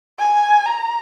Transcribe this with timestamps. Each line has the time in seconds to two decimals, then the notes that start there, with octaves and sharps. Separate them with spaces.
0.19 G#5
0.66 A#5